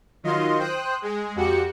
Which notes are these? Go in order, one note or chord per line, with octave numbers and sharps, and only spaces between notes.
D#3 F#3 F4 D#5 C6
C5 G5 D#6 F#6
G#3 G#4
F2 F#4 G4 C#7